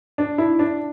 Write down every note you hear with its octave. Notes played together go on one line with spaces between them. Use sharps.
D4
E4
D4